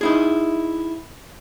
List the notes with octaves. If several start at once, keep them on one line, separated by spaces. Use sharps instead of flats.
D#4 E4 G#4